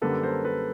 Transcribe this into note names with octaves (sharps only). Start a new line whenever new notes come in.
F#2 D3 G3 A#3 A4 B4
A#4 C5
A4 B4